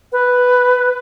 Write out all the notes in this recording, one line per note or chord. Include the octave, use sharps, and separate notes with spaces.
B4